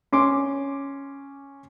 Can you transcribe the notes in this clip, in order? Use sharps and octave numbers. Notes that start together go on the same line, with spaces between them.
C#4 C6 D6